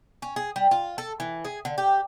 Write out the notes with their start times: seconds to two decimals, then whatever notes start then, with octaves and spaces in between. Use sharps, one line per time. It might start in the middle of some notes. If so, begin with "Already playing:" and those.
0.22 C#4
0.36 G#4
0.56 G3
0.71 F4
0.98 A4
1.20 E3
1.45 G#4
1.65 D3
1.78 G4